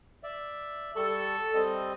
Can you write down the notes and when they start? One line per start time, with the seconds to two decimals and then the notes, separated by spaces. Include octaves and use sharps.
0.23 D5 E5
0.96 G3 A4 C#6
1.54 G3 C4 D#5